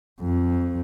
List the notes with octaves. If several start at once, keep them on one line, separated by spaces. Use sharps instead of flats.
F2